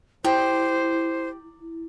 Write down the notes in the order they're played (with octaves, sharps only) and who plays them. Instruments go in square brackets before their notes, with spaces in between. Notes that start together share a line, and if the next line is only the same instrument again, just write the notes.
[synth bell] E4 [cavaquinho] G4 [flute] C5